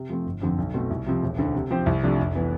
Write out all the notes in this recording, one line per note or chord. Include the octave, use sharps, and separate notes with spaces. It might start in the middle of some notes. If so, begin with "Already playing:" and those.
Already playing: C3
F3 A3 C4
G1
F2 D3 F3 C4
B1
B2 A3 C4
C2
C3 F3 C4
E1
D2 D3
C3
F3 C4 G4 C5
C2
C3 F3 A3 D4
F1
E3 B3